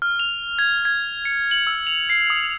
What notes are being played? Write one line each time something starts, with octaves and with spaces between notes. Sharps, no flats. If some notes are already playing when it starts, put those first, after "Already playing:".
F6
F7
G#6
G#6
C#7
F#7
E6
F7
C7
D#6